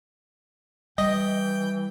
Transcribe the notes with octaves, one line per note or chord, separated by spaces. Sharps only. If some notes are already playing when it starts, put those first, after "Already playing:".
E3 G3 D#5 G5